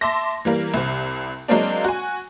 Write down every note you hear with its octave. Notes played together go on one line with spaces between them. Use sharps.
E5 A5 C6 D6 A#6
E3 G3 A#3
C2 C3
F#3 G#3 A#3 C4 D4
F#4 G#5